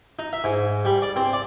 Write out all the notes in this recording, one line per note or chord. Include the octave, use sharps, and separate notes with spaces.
D#4
E5
G#2
G3
D5
C4
D5